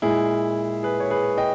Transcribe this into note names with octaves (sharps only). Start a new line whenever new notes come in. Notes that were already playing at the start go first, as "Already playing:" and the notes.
A#2 G#3 E4 G#4
G#4 B4
C#5
G#4 B4
D#5 G5